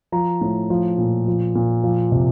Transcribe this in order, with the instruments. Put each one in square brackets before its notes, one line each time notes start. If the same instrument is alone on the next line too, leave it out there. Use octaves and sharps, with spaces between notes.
[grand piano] F3 A#5
A2
F3
A#2
F3
A#2
F3
C3